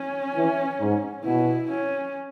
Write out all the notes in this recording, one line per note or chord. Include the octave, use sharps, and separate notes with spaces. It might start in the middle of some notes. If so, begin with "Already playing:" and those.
Already playing: C#4
E3
G#2
B2 E4
C#4